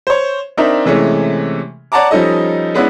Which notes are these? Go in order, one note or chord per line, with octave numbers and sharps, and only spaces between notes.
C5 C#5
C4 D4 D#4 A#4 E5
C3 E3 G#3 A3 C#4
C#5 D5 F#5 A5 A#5 D6
F3 G3 C#4 D#4 A4 D#5
G#3 B3 C#4 D4 E4